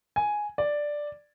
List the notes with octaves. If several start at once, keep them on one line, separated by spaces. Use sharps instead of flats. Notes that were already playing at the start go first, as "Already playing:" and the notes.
G#5
D5